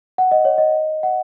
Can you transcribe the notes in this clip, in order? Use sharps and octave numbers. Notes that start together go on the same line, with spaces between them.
F#5
D#5
C#5
D#5
F#5